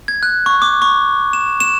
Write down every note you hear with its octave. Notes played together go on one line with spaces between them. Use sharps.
G#6
F#6
C#6
D6
C#6
E7
E7